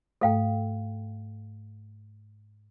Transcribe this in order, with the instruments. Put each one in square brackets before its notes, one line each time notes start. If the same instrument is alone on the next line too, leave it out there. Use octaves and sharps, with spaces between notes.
[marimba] G#2 A3 [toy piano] A4 F5 G5